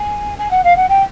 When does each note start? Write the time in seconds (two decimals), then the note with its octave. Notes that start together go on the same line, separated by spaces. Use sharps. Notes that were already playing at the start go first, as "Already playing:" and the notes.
Already playing: G#5
0.39 G#5
0.51 F#5
0.64 F5
0.76 F#5
0.89 G5